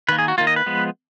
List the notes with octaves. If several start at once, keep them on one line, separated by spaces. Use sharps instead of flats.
D#3 A#3 B4
G#4
F#4
D#3 A#3 F4
D#5
B4
F3 G#3 B3